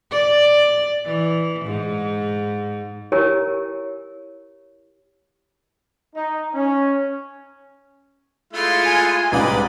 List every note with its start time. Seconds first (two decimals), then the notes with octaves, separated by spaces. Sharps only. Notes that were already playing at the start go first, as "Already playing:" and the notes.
0.11 D5
1.06 E3
1.66 G#2
3.12 E4 G4 A#4 C#5 G#5
6.15 D#4
6.54 C#4
8.53 G#3 A3 E4 F4 C6
8.85 G#5
9.32 C2 G#2 B4 D5 D#5